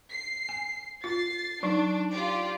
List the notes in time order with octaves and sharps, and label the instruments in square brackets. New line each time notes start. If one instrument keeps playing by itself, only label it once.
[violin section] C7
[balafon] G#5
[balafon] F4 [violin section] A6 C7
[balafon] F#3 D#4 [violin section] D4
[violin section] F4 G4 D5